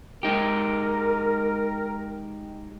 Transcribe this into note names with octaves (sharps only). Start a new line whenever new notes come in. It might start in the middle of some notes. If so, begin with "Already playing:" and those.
G#3 D#4 G4 A#4